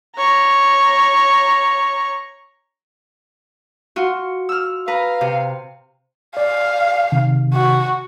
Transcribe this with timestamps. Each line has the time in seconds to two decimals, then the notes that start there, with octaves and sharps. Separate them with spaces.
0.17 C#5 A#5
3.96 F4 F#4
4.49 E6 F6
4.88 B4 F5 A#5
5.21 C3
6.37 D5 F5
7.12 C3 D#3
7.54 F#4